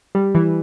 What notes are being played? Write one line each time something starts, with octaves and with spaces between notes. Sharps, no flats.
G3
E3